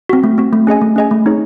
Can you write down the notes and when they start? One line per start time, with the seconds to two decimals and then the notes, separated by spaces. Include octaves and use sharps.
0.09 C4 F#4
0.24 A3
0.38 C4 F#4
0.53 A3
0.67 C#4 G#4 D#5 G#5
0.81 A3
0.96 C#4 G#4 D#5 G#5
1.11 A3
1.25 C4 D#4 G#4 C#5